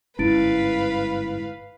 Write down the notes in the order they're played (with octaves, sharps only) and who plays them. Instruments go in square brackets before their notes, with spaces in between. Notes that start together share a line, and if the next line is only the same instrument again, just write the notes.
[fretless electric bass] G1 G#2 C#4 [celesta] E4 A6 D7 [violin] B4 F5